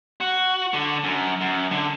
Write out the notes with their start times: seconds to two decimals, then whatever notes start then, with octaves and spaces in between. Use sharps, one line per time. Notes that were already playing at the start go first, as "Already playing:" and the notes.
0.20 F#4
0.74 D3
1.04 F#2
1.41 F#2
1.71 D3